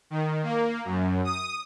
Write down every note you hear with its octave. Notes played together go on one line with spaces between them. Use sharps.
D#3
A#3
F#2
D#6